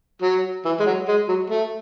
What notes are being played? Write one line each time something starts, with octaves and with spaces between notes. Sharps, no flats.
F#3
E3
G#3
F#3
G#3
F#3
A3